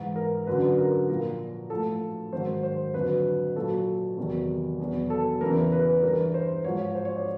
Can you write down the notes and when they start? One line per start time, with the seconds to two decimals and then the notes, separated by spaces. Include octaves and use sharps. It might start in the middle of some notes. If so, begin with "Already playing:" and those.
Already playing: G#2 E3
0.16 A#4
0.47 F#2 D3 F#3 B4
0.78 A#4
1.09 A#2 F3 A#4
1.70 A2 F3 A4
2.32 G#2 D#3 F#3 C5
2.63 C5
2.94 F2 D3 F#3 B4
3.56 A#2 F#3 A4
4.17 E2 C3 D#3 F#3
4.80 E2 B2 F#3
5.10 A4
5.41 E2 C#3 E3 A#4
5.72 B4
6.02 G2 E3 A#4
6.34 C5
6.64 G#2 F3 C#5
6.95 C5
7.05 C#5
7.16 D5